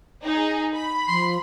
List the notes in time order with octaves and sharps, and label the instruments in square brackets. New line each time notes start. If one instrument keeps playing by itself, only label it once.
[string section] D#4 G#4
B5
[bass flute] F3 [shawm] C6